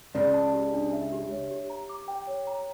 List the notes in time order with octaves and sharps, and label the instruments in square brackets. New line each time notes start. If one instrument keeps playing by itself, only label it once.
[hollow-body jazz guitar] C#2 C#3 [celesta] D5
[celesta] A5
G4
D4
E5
G4
C#5
G4
A#5
D6
G5
C#5
A#5